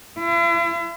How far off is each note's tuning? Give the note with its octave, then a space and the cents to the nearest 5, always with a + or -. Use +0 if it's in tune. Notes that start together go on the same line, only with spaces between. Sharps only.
E4 +45